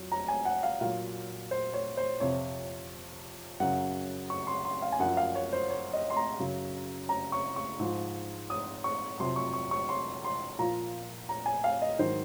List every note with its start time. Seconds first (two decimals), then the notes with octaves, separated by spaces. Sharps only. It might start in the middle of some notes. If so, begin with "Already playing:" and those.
Already playing: F2 F#3
0.12 A#5
0.28 G#5
0.45 F#5
0.63 F5
0.81 A#2 F#3 F5
1.51 C5
1.74 C#5
1.97 C5
2.20 F2 C3 F3 C#5
3.60 F#2 C#3 F#3 F#5
4.30 C#6
4.47 C6
4.65 C6
4.82 F5
4.92 G#5
4.99 F#2 F3 F#5
5.17 F5
5.35 C#5
5.53 C5
5.70 C#5
5.93 D#5
6.10 C6
6.17 A#5
6.40 F#2 C#3 F#3
7.09 A#5
7.32 C#6
7.56 C#6
7.79 G#2 F3
8.50 D#6
8.84 C#6
9.20 F2 C3 F#3 C6
9.36 C#6
9.54 C#6
9.71 C#6
9.89 C6
10.25 C6
10.59 A#2 F3 A#5
11.29 A#5
11.46 G#5
11.64 F5
11.82 D#5
11.99 G#2 D#3 F#3 C5